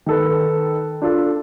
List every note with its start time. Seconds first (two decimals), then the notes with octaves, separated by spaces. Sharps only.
0.06 D#3 A4 B4
1.02 D4 F4 A4